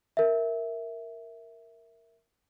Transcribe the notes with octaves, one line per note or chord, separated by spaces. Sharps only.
A#4 E5